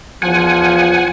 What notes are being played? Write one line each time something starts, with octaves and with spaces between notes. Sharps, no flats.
E2 F3 F#5 G#5